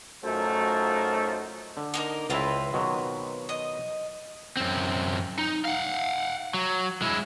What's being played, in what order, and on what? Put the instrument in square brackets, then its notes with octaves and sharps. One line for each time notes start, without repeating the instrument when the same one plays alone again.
[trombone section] F#2 A3 D#4 F4 F#4 C5
[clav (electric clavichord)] D3
[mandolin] A#3 D#4 A#4
[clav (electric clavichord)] C#2 E4 [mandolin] C4 F4 B4
[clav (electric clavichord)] B2 D#3 F#3
[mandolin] D#5
[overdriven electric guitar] F#2 C4
D#4
F5 F#5
F#3
G#3 E4